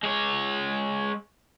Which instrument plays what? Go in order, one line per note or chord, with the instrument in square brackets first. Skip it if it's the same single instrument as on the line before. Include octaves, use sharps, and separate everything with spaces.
[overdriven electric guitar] G#3 C#5